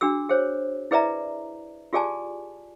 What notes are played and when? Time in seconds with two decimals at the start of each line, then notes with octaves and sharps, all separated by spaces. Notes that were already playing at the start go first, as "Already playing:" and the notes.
0.01 D4 F#4 G#4 E6
0.29 G#4 C5 C#5
0.91 E4 G#4 B4 D5 E5 A#5
1.93 F4 G4 G#4 D5 G#5 A5